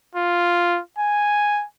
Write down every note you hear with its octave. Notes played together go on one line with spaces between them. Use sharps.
F4
G#5